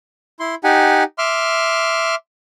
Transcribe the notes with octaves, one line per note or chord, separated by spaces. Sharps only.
E4 C6
D#4 G4 F#5 G#5
E5 C6 D6 F6